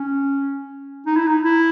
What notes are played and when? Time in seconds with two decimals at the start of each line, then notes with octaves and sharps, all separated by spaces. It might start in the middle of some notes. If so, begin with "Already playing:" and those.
Already playing: C#4
1.06 D#4
1.16 E4
1.27 D#4
1.44 E4